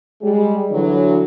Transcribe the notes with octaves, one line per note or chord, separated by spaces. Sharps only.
G3 G#3 G#4
D3 E3 F#3